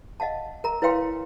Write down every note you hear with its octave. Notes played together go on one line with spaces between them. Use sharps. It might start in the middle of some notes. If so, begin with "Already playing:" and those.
D#5 F5 F#5 A5
A#4 A#5
E4 B4 C#5 F5 G5 C6